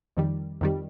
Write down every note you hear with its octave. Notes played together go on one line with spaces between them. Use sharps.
F2 D#3 G3
F2 D#3 G3